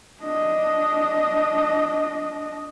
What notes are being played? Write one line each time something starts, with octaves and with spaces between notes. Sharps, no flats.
D4 D#5